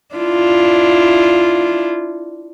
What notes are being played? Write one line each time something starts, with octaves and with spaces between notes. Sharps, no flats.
D4 E4 F4